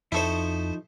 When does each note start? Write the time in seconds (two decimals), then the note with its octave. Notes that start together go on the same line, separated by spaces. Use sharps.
0.12 F2 F3 D#4 E4 A4 C5 C#6